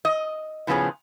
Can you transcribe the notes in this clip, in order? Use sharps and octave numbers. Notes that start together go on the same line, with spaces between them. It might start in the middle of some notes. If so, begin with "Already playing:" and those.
D#5
A2 C#3 F3 B3 C#4 G#4